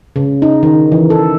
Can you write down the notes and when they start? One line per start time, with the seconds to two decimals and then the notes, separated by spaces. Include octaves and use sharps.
0.16 C#3
0.42 D#4
0.63 D#3
0.92 E3
1.10 A4